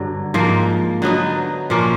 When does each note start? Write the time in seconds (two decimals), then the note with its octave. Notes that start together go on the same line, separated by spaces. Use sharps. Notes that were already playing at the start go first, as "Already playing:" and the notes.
Already playing: G2 D3 F#3
0.34 G#2 F3 A#3
1.02 D3 F#3 B3 D#4
1.70 A#2 F3 A#3 C#4